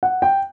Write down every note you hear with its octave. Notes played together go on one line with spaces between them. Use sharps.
F#5
G5